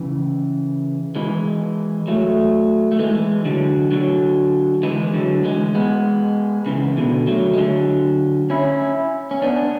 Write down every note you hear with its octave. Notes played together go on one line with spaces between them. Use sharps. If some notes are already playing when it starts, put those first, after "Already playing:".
Already playing: C#3 E3
E3 G#3
F#3 A3
A3
E3 G#3
D3 F#3
D3 F#3
E3 G#3
D3 F#3
E3 G#3
G#3 B3
C#3 E3
B2 D3
F#3 A3
G#3
D3 F#3
C#4 E4
C#4
B3 D4